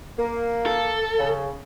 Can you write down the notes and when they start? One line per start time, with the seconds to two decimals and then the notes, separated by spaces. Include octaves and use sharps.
0.18 A#3
0.66 A4
1.18 C#3